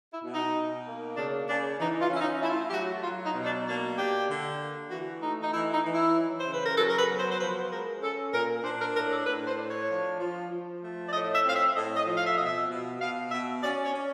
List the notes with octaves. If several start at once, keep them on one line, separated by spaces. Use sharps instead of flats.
E4
B2
D#4
B2
A#3
C#3 D4
C#3 D4
E3 D#4
F4
C#4
E4
D#4
A3 E4
F4
E4
G4
F#3 F#4
F#3 F4
D#4
B2
D#4
D4
A#3 D4
D4 G4
D3
A#3
E3 F#4
A3 D#4
D#4
E3 E4
E4
D#4
E3
E4
F#3
C5
C#3
B4
A#4
F#3 A4
A#4
B4
B3
C5
C5
F3 B4
G#3 A#4
C#4 A4
A#2 A#4
D4 C5
A#4
A2 A#4
A4
A2 B4
C5
D4
C#5
F3
F3
F3
A3
D5
A2 D#5
E5
C4 F5
E5
A2 D#5
D#5
F3
F5
E5
B2 D#5
E5
B2
B2 F5
B2 E5
C#4 D5
C#5
C#4